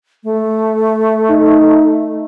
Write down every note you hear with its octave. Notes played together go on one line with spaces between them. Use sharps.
A3
D#4